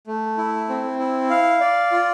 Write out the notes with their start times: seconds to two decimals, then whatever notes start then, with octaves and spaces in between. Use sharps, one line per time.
0.07 A3
0.38 E4
0.69 C4
0.99 E4
1.30 F5
1.61 D5
1.92 F4